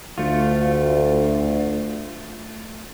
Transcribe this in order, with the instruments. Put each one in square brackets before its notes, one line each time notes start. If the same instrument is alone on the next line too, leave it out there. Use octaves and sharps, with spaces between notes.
[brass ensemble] D2 [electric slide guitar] A3 F4